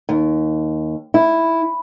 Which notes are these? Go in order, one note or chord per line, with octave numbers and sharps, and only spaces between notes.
D#2
E4